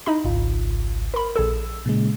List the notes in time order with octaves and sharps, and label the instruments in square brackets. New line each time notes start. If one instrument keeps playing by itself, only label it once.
[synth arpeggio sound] D#4 E4 B5
[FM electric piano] G#1 C#2 F4
[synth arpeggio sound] A#4 B5
[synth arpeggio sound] A#1 G#4 A4 [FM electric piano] E6
[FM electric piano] A#2 C#3 G#3